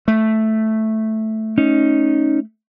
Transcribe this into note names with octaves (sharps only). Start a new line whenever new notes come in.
A3
C#4 D#4